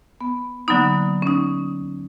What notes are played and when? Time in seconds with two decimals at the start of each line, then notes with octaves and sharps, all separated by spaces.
0.21 B3
0.68 D3 F#3 A#3 B3 D#4
1.22 C#4 D#4